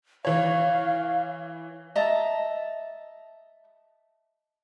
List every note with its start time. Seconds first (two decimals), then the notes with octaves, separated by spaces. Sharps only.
0.25 E3 C#5 F5
1.96 D#5 E5 A5 A#5